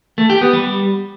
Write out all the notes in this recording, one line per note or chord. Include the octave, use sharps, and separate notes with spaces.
A3
G4
B3
G3